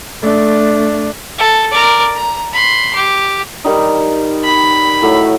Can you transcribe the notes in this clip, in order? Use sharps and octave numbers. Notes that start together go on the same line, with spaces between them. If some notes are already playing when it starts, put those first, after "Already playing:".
A3 D4
A4
A#4 D5
A#5
B5 C6
G4
D#3 G3 D#4
B5
A2 F#3 E4